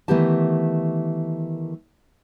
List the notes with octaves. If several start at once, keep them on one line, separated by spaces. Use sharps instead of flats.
D#3 E3 A3 B3 G4 A5